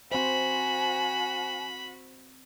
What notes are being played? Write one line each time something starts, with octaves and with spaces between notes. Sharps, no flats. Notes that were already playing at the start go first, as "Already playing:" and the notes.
C4 F#4 C5 G#5 B5